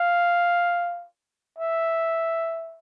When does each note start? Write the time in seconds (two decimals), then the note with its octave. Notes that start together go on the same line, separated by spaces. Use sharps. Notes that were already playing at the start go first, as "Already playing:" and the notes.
Already playing: F5
1.59 E5